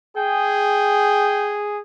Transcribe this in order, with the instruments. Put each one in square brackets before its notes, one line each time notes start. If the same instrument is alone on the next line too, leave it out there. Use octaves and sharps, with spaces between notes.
[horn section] G#4 [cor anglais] G5